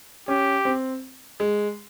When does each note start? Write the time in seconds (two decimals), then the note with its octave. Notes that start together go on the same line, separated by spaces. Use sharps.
0.28 C#4 G4
0.65 C4
1.40 G#3